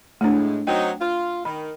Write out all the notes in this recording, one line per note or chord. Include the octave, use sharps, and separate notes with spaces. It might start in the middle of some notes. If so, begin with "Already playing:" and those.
A2 G#3 A3 D4
F#3 C4 D#4 G5
F4
D#3 B5